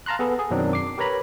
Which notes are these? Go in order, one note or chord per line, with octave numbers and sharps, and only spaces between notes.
F5 A5 A#5 C6 F#6
B3 G#4 A4 B4
G#4
F#2 B2 D#3 F#3 C4 D4
D6 C7
G4 A#4 B4 C#5 A#5 B5